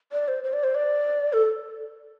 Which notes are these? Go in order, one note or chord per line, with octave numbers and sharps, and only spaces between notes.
D5
C5
C5
D5
C5
D5
A4